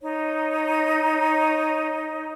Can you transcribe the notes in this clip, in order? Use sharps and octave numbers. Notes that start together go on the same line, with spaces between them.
D#4 C#5